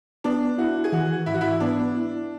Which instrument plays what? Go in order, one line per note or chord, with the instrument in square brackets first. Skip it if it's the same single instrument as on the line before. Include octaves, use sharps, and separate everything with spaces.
[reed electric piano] B3 [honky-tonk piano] D4
[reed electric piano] E4 [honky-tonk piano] F#4
[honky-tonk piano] G#4
[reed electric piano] E3 [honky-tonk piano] F#4
[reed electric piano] G#2 [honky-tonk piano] E4
[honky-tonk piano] F#4
E4
[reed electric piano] B3 [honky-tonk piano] D4
[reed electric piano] E4